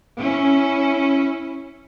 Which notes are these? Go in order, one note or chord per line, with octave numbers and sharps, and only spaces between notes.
C#4 E4